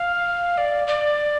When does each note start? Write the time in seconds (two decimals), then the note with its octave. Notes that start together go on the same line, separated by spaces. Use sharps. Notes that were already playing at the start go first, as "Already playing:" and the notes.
Already playing: F5
0.58 D5
0.87 D5